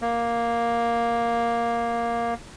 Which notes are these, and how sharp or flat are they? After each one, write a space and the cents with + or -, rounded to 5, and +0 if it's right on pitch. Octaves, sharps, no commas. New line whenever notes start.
A#3 +5